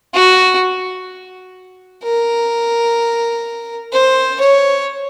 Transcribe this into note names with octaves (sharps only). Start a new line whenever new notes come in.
F#4
A#4
C5
C#5